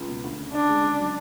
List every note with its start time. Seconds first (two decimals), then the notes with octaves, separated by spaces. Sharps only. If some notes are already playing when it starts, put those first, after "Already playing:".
Already playing: C#2
0.08 B2
0.24 D2
0.39 C#3
0.53 D3 D4
0.69 G#3
0.84 C#3
0.99 F#3